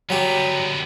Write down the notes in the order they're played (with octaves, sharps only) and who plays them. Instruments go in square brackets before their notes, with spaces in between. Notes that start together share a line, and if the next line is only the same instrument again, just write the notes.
[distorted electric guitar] D3 B3 [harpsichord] F#3 G4